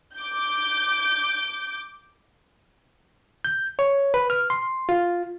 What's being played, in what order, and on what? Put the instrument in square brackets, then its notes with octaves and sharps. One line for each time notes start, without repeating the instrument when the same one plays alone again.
[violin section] D6 G6
[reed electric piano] G6
C#5
B4
F6
C6
F4